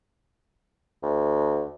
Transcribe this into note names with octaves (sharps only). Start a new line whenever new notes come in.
D2